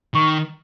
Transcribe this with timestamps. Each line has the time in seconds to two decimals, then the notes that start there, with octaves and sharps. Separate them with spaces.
0.15 D#3 C#6